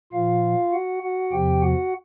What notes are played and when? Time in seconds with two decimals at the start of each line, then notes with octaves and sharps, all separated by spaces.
0.13 A#2 F3 F4 F5
0.73 F#4 F#5
1.03 F#4 F#5
1.32 E2 C3 F3 G4 G5
1.62 F#4 F#5